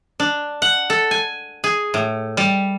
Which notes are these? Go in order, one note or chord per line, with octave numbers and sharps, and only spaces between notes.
D4
F#5
A4
G#5
G#4
A2
G3